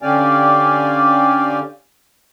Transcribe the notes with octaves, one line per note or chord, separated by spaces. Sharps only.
D3 C#4 G4 D5 F5 G#5